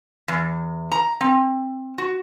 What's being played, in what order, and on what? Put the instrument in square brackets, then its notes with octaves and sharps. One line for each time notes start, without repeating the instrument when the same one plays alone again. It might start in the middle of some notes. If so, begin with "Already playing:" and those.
[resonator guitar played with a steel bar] E2
A#5
C4
F#4